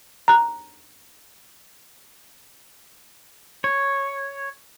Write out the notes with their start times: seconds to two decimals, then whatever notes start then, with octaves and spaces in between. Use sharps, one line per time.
0.28 A#5 F#6
3.64 C#5